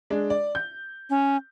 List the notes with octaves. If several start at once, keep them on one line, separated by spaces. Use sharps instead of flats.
G#3 D4
D5
G6
C#4